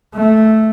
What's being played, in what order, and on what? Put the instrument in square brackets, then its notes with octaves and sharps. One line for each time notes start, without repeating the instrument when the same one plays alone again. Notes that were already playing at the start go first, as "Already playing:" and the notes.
[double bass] A3